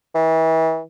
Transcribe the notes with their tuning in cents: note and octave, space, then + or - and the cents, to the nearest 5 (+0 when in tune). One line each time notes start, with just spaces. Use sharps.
E3 -35